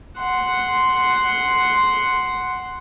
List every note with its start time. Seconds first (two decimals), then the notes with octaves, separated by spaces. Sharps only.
0.19 F#5 C6